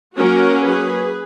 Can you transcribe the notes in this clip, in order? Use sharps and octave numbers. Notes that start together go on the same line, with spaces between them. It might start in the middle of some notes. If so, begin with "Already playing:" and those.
F#3 A#3 C#4 F#4 A#4
G#4 B4